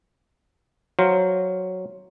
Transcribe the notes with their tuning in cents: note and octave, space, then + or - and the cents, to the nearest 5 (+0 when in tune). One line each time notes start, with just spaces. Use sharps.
F#3 +0 C5 +10 F5 +0